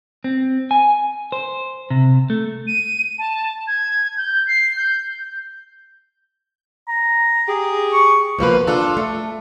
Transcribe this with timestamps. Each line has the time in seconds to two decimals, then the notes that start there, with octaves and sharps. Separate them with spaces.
0.24 C4
0.71 G#5
1.32 C5
1.90 C3
2.30 A3
2.67 D#7
3.19 A5
3.67 G#6
4.17 G6
4.47 C7
4.77 G6
6.88 A#5
7.48 G4 G#4
7.93 C#6
8.39 B2 F3 A#3 B4
8.67 D4 F4 A4
8.97 A3